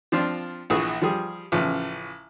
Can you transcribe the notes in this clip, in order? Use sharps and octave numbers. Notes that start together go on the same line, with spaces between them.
F3 C4 D4 F4
A#1 E3 G#4 C#6
F3 G3 G4 G#4
A1 C#3 F3